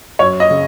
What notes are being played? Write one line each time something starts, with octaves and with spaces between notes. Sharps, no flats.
F#2 C#5
D#5
C#3